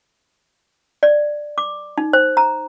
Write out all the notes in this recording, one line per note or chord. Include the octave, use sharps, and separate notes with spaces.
D5
D6
D#4
C5
A#5